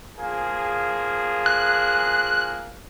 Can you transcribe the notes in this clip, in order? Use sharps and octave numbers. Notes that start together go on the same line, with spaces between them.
F3 A#3 G#4
F#6